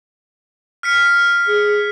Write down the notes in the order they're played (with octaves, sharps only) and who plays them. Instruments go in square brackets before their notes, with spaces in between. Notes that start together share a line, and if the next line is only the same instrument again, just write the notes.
[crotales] F6 B6 C#7
[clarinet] G#4